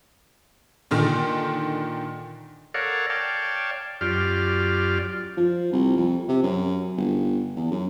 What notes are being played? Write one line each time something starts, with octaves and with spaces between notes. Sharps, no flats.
A#2 D3 D#3
A4 A#4 C#5 D5 F5 F#5
C#5 D5 F5 G5 A5
F#2 F4 G4 D5 F6
F3
C2
F2
C3
F#2
G1
E2
F#2